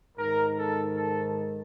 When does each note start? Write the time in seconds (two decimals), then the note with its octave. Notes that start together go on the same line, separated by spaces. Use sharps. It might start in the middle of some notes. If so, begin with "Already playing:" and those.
0.18 G#2 D#3 A#4
0.56 A4
0.96 A4